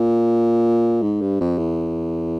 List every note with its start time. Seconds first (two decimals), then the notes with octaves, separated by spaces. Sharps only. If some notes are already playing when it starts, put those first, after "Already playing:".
Already playing: A#2
1.02 G#2
1.22 G2
1.40 F2
1.58 E2